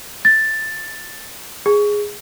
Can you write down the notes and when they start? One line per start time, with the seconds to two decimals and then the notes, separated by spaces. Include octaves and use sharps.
0.25 A6
1.66 G#4